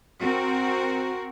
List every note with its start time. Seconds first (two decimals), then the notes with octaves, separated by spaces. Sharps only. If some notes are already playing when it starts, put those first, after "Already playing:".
0.22 C4 F#4 A#4